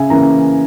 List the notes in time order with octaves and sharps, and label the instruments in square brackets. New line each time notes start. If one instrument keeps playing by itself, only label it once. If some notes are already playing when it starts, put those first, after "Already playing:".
Already playing: [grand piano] C#3 E5 G#5
E3 A#3 C#4 A#5